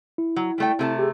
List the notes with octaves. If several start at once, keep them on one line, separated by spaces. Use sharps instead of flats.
E4
F#3
G3 A3 G5
C3 A3 A5
G4 G#4